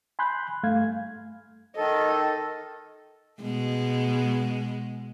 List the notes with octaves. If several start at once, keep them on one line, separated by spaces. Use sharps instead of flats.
G#5 B5 C6 F#6 G6
G2 A3 F5 G#6
D#3 A4 D#5
B2 G#3